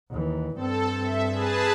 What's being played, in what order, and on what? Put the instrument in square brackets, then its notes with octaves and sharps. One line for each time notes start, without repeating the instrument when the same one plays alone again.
[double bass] D#2 E3
[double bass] G2 C4 [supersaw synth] A4
[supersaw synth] E5
G#4 B4 A5